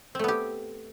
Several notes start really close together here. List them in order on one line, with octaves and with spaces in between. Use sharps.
C4 A3 B3 G4